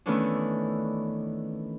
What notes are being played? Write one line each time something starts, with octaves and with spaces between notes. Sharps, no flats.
D#3 E3 A3 B3 C#4 D4